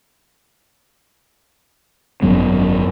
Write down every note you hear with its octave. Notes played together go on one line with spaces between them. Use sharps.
G#1 F#2 F#3 B3